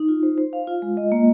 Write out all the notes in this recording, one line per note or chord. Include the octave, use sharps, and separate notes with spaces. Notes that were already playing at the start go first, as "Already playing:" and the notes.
Already playing: D#4
F4
C5
C5
F5
F4
G#3
D#5
A#3